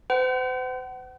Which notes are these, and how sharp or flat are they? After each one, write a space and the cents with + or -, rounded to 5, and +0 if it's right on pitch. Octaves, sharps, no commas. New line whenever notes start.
C5 -40 F#5 +35